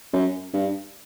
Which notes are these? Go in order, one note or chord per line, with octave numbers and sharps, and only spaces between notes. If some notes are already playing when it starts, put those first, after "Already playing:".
F#2
G2